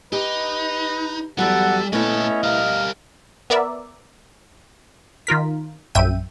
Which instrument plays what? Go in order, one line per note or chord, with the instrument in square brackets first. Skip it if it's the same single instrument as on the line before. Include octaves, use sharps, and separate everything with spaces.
[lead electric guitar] D#4 [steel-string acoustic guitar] G4 [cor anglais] B4
[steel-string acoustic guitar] E2 F#3 [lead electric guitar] G3 [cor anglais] A4 [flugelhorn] F#5
[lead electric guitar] A#2 A4 [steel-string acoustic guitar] A3 B3 E4 [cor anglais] C#4 [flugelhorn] D#5
[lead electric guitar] G3 A#4 [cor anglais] F5
[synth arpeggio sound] B3 A#4 D5 E5
D#3 F4 A#4 B6
A#1 F#2 E5 G5 D#7